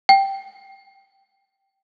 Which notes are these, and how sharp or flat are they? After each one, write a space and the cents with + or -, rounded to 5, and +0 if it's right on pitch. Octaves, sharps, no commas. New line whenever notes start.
G5 -5